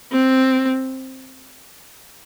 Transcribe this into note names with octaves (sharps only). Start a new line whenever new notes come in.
C4